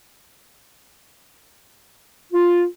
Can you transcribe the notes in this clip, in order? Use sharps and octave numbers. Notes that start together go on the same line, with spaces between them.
F4